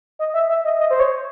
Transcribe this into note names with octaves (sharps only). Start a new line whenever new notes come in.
D#5
E5
E5
D#5
D#5
C5
C#5